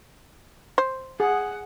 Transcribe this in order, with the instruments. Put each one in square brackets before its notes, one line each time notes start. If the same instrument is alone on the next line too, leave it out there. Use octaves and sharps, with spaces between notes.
[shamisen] C5
[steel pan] G#4 [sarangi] F#5